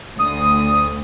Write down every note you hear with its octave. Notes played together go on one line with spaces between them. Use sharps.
D2 D#6